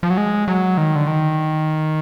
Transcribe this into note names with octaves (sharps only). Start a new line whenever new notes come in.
F3
F#3
G#3
F#3
D#3
D3
D#3